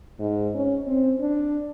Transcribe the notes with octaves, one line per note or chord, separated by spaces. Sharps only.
G#2
C#4
C4
D4